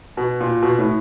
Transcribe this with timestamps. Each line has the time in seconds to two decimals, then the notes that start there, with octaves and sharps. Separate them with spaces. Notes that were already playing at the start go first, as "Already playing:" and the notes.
0.17 B2
0.41 A#2
0.62 B2
0.79 A2